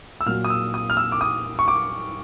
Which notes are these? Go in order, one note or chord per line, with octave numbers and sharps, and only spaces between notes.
E6
A#2 F#3 F6
D#6
E6
D#6
F6
E6
D6
D#6
C#6
D6